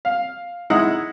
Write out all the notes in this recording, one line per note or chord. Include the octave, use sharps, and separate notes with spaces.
F5
G#3 D#4 E4 F#5